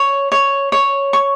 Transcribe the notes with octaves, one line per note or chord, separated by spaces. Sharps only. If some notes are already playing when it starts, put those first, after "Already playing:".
Already playing: C#5
C#5
C#5
C#6